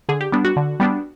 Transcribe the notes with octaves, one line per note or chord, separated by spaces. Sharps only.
D3 G#4
G4
G3 B3 D4
F#4
D3
G3 B3 D4